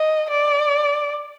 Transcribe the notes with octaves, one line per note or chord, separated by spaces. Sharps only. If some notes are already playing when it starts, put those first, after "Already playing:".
Already playing: D#5
D5